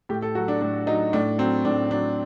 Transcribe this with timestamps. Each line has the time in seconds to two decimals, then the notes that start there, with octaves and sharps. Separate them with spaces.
0.09 A2 G4
0.22 A4
0.35 F#3 F#4
0.48 D4
0.61 A2 D4
0.87 F#3 D#4
1.13 A2 D4
1.38 F#3 C4
1.65 A2 D4
1.91 F#3 D4